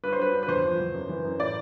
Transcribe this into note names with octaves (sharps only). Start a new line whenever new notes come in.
G2 B4
C5
F#3 B4
G2
B4
E2 C5
F3
E2
F#2
E3
F#2
A2 D5